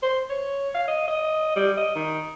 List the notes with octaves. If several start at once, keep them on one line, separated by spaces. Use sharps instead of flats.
C5
C#5
F5
D#5
D#5
G3
D#5
D#3